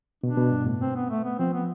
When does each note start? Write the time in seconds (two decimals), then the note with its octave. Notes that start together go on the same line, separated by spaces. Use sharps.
0.23 B2 D4
0.37 B2
0.52 G2
0.66 A2
0.81 C4
0.96 B3
1.10 A3
1.24 B3
1.39 F3 C4
1.53 B3